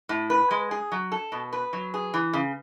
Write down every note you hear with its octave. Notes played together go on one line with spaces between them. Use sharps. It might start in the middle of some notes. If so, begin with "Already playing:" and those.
A2
B4
G#3
G#4
F#3
A4
B2
B4
F#3
G#4
E3
C#3